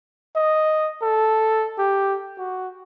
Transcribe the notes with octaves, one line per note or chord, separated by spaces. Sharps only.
D#5
A4
G4
F#4